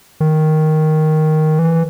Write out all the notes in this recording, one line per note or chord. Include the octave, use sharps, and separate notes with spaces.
D#3
E3